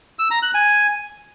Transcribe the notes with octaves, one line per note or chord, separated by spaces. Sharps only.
E6
A#5
F#6
G#5